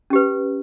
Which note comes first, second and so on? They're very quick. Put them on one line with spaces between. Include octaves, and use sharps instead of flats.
C#4 G4 B4